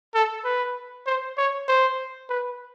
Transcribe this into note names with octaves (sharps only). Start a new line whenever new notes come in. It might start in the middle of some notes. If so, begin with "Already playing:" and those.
A4
B4
C5
C#5
C5
B4